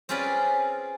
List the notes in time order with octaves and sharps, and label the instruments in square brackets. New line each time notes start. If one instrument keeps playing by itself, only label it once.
[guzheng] C4 C#4 F4 G#4 B4 D5